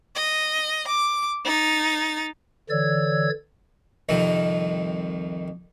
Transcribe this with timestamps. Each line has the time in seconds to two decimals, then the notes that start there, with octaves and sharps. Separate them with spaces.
0.15 D#5
0.88 D6
1.45 D#4 A6
2.70 D3 E3 C#5 D5 E6 G#6
4.09 C2 F2 D#3